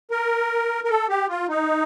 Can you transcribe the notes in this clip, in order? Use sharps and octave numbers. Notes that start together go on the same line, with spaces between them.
A#4
A#4
A4
G4
F4
D#4